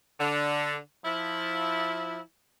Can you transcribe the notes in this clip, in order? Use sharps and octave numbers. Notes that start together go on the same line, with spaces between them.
D3
F3 E4